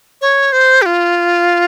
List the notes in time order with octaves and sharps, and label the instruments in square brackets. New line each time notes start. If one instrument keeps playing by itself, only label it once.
[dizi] C#5
C5
G4
F4